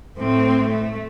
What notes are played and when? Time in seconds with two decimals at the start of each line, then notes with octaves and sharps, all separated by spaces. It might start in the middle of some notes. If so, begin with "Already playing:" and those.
0.17 A2 C4
0.69 A3